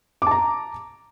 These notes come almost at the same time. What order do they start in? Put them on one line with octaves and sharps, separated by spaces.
D6 A5 A#5